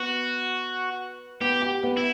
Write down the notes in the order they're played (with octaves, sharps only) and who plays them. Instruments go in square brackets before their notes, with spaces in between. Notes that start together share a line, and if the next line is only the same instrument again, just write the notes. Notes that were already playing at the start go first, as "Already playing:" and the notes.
Already playing: [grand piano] B3 B4 [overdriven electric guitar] F#4
[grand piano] B3 B4 [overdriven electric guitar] G4
[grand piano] G4 G5
B3 B4
[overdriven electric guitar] E4